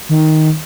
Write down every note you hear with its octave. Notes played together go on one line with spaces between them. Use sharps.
D#3